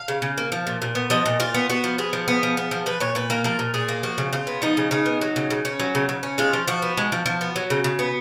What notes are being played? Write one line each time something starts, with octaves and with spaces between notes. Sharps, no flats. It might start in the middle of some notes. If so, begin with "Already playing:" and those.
Already playing: F5
C#3
C#3
A#3
F3
A#2
A#2
B3
F3 D#5
A#2
A#2 F4
B3
B3 F#4
F3
B3 G#4
F3
B3
F3
B3
F3
F3 B4
A#2 C#5
A#2 B4
A#3 A#4
F3 A#4
A#2
A#2 G#4
A#3
F3 F#4
C#3
C#3 F4
B3
F3 D#4
C#3
C#3 D#4
B3
F#3
C#3
C#3
C#4
F#3
C#3
C#3
C#4
G#3 F4
F3
F3 F#4
B3
G#3
F3
F3
B3
F#3
C#3
C#3
B3